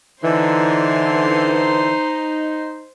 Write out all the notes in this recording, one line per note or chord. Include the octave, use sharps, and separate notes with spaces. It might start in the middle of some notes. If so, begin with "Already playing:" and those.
D3 E3 D#4 C5 C6